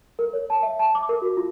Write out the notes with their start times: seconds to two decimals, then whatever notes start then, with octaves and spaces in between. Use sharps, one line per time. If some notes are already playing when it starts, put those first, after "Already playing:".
0.19 A#4
0.33 C#5
0.50 A5
0.63 E5
0.79 A5
0.95 D6
1.09 A#4
1.22 F#4
1.37 F4